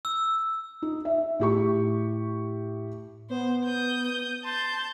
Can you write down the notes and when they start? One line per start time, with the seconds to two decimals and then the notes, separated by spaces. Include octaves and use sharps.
0.05 E6
0.82 D#4
1.05 E5
1.40 A2 G4 C#6
3.30 B3 C5
3.65 D#6 G6
4.44 A5 C6 G6